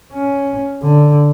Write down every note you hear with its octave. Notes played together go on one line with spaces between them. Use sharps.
C#4
D3